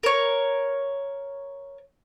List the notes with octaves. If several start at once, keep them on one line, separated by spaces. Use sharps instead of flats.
A#4 C#5